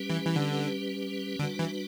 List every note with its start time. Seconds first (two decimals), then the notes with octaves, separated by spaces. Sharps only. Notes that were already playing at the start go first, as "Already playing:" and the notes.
Already playing: G3 C#4 G4 B4
0.10 E3
0.26 E3
0.36 D3
1.39 D3 G3 D4 F#4 B4
1.59 E3